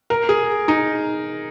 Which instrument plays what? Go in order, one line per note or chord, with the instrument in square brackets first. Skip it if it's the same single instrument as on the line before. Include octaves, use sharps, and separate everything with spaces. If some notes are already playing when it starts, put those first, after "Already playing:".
[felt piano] A#4
G#4
D#4